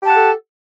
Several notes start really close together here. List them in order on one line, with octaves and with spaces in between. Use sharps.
G4 A5 F#5 A4